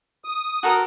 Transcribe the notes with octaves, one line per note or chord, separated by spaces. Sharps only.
D#6
F#4 A4 A#4